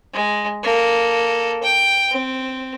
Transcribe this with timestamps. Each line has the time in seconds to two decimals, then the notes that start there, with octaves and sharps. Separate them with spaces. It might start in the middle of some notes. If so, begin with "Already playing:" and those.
0.14 G#3
0.63 A#3 A4
1.63 G5
2.11 C4